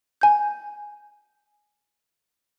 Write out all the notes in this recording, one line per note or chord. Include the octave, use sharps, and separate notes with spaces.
G#5 G6